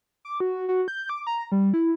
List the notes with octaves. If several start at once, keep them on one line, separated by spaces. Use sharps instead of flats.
D6
F#4
F#4
G6
D6
A#5
G3
E4